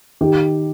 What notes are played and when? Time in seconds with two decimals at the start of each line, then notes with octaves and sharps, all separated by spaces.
0.21 D#3 G4